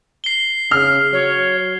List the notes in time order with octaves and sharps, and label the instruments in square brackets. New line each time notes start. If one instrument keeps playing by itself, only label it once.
[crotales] C7 G7
[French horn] C#3 [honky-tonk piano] F6
[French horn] F#3 [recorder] C#5